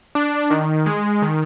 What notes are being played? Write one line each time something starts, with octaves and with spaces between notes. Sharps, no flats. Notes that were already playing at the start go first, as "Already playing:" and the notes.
D4
D#3
G#3
D#3